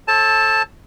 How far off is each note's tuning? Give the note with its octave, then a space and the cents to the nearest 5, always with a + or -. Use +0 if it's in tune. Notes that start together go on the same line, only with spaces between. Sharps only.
A4 -10 C5 +45 A5 +0